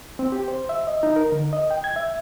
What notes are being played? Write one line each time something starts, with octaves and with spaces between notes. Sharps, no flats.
C4
G4
C5
E5
D#5
D#4
A#4
D3
D#5
G5
G#6
E5